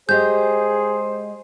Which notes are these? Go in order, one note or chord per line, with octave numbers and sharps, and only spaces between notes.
G#3 G4 G#4 C5 D#5 G6